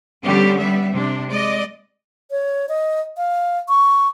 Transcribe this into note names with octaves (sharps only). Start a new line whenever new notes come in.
D3 G3 B3 C#4 G4
G3 B3 E5
C3 D4
G#3 D5 D#5
C#5
D#5
F5
C#6